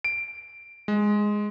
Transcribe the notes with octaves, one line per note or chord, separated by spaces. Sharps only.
D7
G#3